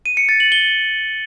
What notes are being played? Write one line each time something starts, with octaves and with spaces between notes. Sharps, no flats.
D#7
C#7
A6
F#7
G7